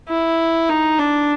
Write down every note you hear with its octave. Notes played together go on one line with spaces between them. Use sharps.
E4
D#4
D4